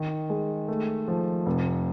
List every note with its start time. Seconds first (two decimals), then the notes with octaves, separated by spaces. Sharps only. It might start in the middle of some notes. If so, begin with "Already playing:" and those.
Already playing: D#3
0.30 G#3
0.68 A3
1.08 F3
1.46 F1